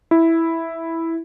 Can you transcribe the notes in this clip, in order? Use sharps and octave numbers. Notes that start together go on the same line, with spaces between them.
E4